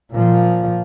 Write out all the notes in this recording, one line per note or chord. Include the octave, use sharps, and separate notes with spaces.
A#2 F3